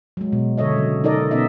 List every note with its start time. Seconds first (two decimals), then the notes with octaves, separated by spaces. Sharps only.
0.17 F#3 G#3
0.33 B2
0.58 D3 A4 C#5 D#5 E5
0.76 C#3 F#3
1.04 D#4 A4 A#4 D5 D#5
1.31 B2 B3 C#4 D#4 D#5 E5